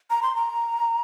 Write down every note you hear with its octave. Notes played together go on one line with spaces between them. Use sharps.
A#5
C6
A#5